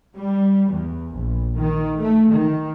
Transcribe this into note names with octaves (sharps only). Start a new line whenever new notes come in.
G3
E2
A#1
D#3
A3
D#3